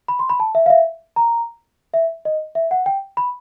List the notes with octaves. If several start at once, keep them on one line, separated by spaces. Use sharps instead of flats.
B5
C6
B5
A5
E5
F5
E5
A#5
E5
D#5
E5
F#5
G5
B5